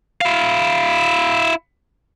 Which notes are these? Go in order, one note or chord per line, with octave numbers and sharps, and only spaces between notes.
E4 F5